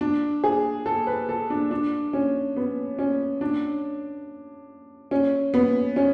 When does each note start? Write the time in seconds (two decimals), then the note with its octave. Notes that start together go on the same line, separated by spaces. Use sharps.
0.01 D4
0.44 G#4
0.86 A4
1.07 B4
1.29 A4
1.50 D4
1.71 D4
2.13 C#4
2.56 B3
2.99 C#4
3.41 D4
5.11 C#4
5.54 B3
5.96 C#4